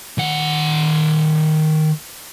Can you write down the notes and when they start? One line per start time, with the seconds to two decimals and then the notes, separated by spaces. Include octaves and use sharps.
0.18 D#3 F#5